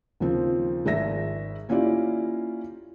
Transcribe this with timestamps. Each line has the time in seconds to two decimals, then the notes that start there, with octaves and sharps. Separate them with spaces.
0.20 D#2 C#3 F3 C4
0.86 G#1 G#4 E5 A#6
1.69 A#3 C#4 E4 F4 G4 D5